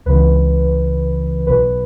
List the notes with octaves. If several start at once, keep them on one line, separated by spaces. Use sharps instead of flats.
C#2 C#3 E3 B4
B1 B2 B4